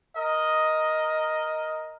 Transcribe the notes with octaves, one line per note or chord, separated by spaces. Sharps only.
A#4 D#5